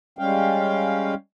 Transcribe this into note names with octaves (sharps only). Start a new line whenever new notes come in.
G3 G#3 C#4 F5 G5